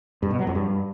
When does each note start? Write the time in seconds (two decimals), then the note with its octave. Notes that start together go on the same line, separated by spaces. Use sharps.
0.23 G2
0.31 B2
0.39 F#3
0.47 F2
0.55 G2